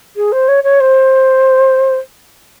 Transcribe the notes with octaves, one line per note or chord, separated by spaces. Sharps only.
G#4
C5
C#5
C#5
C5